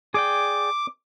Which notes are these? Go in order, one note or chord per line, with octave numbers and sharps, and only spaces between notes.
G#4 D5 G5 D6